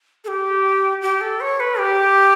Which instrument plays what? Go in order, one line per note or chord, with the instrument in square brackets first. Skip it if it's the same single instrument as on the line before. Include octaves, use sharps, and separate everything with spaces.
[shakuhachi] A4
G4
G4
A4
C#5
B4
G4